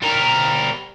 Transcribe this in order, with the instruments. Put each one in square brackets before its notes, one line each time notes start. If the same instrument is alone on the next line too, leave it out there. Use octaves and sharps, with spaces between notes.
[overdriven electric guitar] G3 A#4